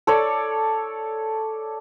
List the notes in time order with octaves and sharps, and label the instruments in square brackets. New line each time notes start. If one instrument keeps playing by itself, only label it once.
[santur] A4 C#5 D5